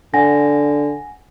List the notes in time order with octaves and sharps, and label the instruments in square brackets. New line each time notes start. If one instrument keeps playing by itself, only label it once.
[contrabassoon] D3 [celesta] F#5 G#5 A#6